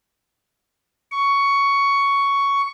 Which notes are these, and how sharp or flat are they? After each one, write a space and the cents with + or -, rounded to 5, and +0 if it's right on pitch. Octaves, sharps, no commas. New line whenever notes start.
C#6 +10